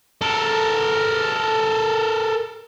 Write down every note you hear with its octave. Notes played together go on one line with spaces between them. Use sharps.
A4 A#4